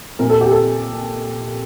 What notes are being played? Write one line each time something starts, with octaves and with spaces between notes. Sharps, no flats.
A#2 A#4
A4
G4
A4